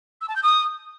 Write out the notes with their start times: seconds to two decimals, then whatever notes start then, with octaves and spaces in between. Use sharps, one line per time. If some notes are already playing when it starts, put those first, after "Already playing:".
0.21 E6
0.28 A5
0.36 G6
0.43 D#6